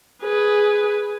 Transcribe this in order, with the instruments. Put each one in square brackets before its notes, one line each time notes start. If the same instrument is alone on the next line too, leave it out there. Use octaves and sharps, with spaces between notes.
[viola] G#4 B4